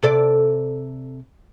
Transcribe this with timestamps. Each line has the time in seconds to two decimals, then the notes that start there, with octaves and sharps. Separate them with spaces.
0.03 C3 A4 D5